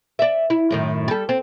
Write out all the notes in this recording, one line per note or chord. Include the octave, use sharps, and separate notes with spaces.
D5 E5
E4
F#2 A2 D#3
G3 A4
C4